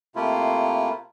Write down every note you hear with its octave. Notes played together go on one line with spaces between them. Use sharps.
C3 A3 A#3 E4 F4